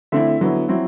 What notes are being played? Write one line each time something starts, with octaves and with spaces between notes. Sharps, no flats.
D3 A3 C4 E4 E5
D3 F#3 B3 E4
F#3 C4 E4